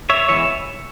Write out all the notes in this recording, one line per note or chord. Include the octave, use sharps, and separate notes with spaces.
C#5 E5
E3 G#3 B3 C#5 E5